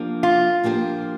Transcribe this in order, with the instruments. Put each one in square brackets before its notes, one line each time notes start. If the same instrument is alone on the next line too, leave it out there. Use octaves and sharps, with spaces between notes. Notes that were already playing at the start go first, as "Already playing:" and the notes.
Already playing: [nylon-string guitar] F3 A#3 D4 G4 C5
[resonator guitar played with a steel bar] F4
[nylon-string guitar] F3 A#3 D4 G4 C5